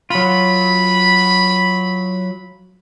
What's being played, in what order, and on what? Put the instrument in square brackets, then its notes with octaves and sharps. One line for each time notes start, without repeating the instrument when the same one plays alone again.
[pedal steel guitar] F#3 F4 [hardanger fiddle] B5